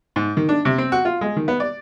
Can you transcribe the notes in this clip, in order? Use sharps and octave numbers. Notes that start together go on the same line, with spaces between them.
G#2
D#3
D4
C3
C4
F#4
F4
G#3
D#3
B3
D5